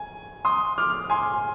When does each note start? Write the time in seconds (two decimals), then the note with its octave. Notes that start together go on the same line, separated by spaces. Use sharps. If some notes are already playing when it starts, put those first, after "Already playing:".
Already playing: G#5
0.45 C6 D#6
0.78 D6 F6
1.10 G#5 C6